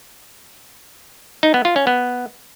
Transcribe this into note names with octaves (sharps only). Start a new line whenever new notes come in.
D#4
B3
F4
C#4
B3